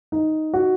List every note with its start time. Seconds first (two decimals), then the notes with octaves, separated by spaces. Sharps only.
0.12 D#4
0.54 F#4